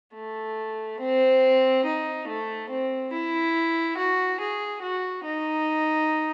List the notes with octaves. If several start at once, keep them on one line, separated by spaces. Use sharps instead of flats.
A3
C4
D#4
A3
C4
E4
F#4
G#4
F#4
D#4